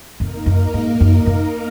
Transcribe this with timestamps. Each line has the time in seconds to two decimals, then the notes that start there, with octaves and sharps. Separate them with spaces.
0.20 F2 A#3 D#4 A#4
0.46 F#2
0.74 G#2
1.00 F#2
1.26 F#2